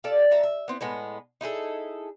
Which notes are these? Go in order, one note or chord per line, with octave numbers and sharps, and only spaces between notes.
F4 G4 A4 D5
F#4 E5 A5 A#5
E5
B3 C4 E4
A2 G#3 B3
D#4 E4 G#4 A4